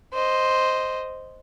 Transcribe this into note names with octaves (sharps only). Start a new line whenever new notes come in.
C5 D#5